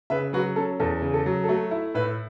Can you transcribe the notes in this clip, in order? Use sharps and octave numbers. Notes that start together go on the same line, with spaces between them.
C#3 B4 E5
F#3 F#4 B4
C#4 A4
E2 A4
C#3
A4
F#3
A4
A3 F#4
E4
A2 B4 E5